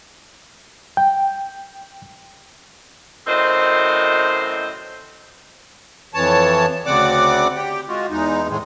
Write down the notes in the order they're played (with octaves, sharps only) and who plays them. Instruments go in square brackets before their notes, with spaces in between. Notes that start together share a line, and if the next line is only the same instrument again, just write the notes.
[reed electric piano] G5
[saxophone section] F#2 A2 C4 C5 D#5
[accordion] F2 E3 C#5 A5
D2 C#3 C4 D5 F#5 D6
G4 G5
G#3 F4 F#4
E2 G#3 D#4
A2 D#3 G#3